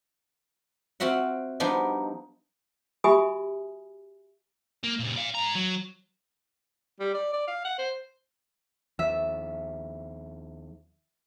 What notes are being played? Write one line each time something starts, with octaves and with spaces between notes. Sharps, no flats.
C4 F4 F#4 E5 F#5
F3 G3 B3 D4 D#4
F#4 G4 E5 G#5 B5 D#6
A#3
A#2 C#3
D5 F5
G#2 A#5
F#3
G3
D5
D5
F5
F#5
C5
D#2 F3 E5